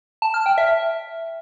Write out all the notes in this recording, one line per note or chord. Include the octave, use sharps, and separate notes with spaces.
A5
F6
G5
E5